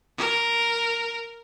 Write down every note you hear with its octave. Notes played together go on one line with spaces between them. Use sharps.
A#4